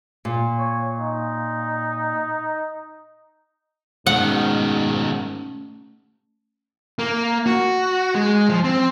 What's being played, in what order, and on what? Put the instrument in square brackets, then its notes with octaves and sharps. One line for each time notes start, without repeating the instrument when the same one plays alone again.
[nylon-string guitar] A#2
[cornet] C#5
D#4
[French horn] G#2 [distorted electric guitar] B2 D#3 [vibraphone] A3 C#4 [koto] F#5
[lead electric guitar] A#3
F#4
G#3
F3
C4